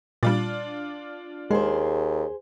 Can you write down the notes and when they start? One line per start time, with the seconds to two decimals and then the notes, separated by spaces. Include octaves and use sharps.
0.23 A#2 G3 D4 F4 D5
1.51 D#2 G#3 G#4 C5